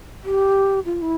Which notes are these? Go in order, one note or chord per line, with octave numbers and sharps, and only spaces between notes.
G4
F4
E4